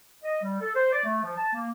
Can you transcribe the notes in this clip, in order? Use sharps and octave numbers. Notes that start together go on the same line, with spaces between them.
D#5
G3
A4
C5
D5
A3
F3
A5
A#3